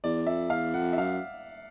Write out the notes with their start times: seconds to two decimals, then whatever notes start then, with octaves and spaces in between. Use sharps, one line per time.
0.04 E2 D5
0.27 F2 E5
0.50 E2 F5
0.74 F2 F#5
0.93 E5
0.98 F#2 F5